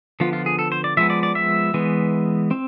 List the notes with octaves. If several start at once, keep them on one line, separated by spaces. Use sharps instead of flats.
D3 F3 B3 F4
F4
G#4
A4
C5
D5
F3 G#3 B3 E5
D5
D5
E5
E3 G#3 B3
C4